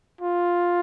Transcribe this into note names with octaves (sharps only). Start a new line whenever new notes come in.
F4